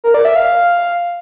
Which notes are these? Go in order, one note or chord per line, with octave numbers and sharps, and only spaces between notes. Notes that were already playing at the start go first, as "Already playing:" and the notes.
A#4
D5
E5
F5